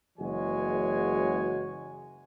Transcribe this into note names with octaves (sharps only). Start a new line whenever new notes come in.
F#1 E3 G#3 F#4 C#5 G#5